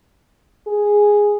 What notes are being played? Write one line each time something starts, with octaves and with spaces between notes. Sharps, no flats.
G#4